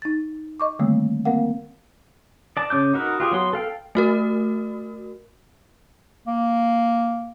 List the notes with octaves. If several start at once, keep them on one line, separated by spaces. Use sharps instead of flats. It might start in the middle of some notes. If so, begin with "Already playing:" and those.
D#4 A6
D#5 C#6 D6
D3 D#3 G3 A3 A#3 C4
A#3 C4 A#4 F5 F#5
D5 A5
C#3 C#4 D6 G6
D#4 F#4 A#4 B4
F4 G4 G#4
F#3 B3 C6
A4 F5 G5
A3 F#4 A#4
A#3